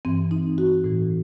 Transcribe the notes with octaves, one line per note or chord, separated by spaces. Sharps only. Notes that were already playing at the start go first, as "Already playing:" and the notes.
G2 E3 C4
D#4
F#4
A2 E3